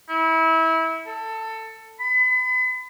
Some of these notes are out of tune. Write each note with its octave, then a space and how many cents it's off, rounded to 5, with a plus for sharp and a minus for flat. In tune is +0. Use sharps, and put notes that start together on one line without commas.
E4 -25
A4 +15
B5 +35